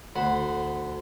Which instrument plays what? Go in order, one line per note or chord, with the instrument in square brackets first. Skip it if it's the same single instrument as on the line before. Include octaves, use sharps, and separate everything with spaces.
[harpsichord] D2 C5 F#5 B5